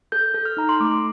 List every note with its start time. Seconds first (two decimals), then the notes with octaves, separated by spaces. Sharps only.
0.12 A4 G6
0.34 A4
0.45 F6
0.57 D#4 A#5
0.69 C6
0.80 A3 D6